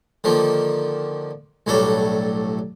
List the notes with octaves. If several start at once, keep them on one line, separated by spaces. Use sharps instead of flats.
D3 D#3 F3 A#3
B1 A2 F#3 G3 D4 A4